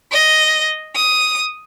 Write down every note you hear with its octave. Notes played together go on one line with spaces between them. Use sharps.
D#5
D#6